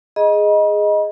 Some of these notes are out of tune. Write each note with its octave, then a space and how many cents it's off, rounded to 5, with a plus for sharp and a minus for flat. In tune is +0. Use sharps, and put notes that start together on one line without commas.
G#4 +0 D#5 +0 B5 -45